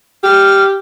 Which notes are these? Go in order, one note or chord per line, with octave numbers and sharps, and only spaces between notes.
G4 F6